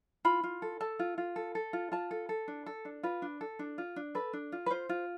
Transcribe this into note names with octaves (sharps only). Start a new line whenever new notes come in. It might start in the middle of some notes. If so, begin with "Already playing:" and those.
F4 B5
F4
A4
A4 A5
F4
F4
A4
A4
F4
F4 A5
A4
A4
D4
A4
D4
F4 B4
D4
A4
D4
F4
D4
A4 B4
D4
F4
B4
F4 C5
F4